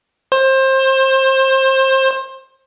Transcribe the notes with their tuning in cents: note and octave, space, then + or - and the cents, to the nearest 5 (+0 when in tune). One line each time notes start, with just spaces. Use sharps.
C5 +25